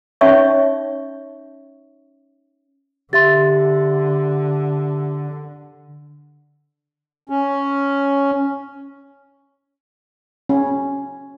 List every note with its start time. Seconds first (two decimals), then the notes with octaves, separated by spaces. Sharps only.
0.21 C#4 D#4 C#5 E5 C#6
3.13 D3 G4 E5 C6 A6
7.29 C#4
10.49 C#4